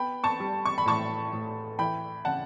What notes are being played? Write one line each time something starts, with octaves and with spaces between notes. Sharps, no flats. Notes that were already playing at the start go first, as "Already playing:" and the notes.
Already playing: B3 G5 B5
A5 C#6
G3
C#6
B5
A2 A5 C#6
A2
E3 G5 B5
C#3 F#5 A5